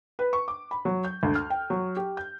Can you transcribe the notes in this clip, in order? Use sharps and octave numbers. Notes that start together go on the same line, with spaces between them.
B4
C#6
D6
B5
F#3
G6
D2
F6
G5
F#3
G4
G6